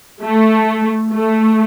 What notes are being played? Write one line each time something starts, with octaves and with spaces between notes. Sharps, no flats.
A3
A3